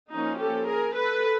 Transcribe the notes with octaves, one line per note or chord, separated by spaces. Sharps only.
F3 A#3 C#4 D#4
G4 A4
G#4 A#4
A4 B4